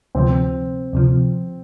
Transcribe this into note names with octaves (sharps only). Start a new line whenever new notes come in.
D2 C3 F3 C4
D2 C3 F3